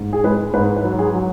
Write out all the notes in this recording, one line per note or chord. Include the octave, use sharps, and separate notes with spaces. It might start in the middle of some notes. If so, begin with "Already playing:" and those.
Already playing: G#2
G#4
G#3 B4
G#2 B4
B4
F#3
G#4
F#3